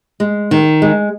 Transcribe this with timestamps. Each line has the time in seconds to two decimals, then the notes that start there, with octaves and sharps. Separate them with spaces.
0.20 G#3
0.51 D#3
0.82 G#3